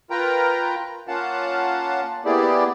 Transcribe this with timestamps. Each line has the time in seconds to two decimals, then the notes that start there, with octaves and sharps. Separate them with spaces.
0.10 F4 A#4 B4 G5 A#5
1.08 A#3 C#4 F4 F5 F#5 A5
2.25 A#3 B3 E4 G4 G#4 D5